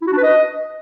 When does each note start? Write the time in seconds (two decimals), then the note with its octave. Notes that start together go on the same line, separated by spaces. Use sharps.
0.02 E4
0.07 F#4
0.12 D4
0.18 B4
0.23 D#5